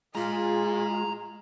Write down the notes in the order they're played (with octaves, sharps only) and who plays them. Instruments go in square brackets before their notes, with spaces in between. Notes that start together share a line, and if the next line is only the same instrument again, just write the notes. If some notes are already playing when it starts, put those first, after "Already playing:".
[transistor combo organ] G#3 [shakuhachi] F4 [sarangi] G#4 [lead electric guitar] A#5 C6